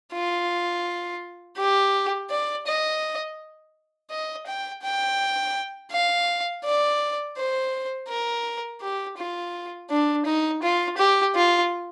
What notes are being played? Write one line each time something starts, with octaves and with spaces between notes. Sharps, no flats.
F4
G4
D5
D#5
D#5
G5
G5
F5
D5
C5
A#4
G4
F4
D4
D#4
F4
G4
F4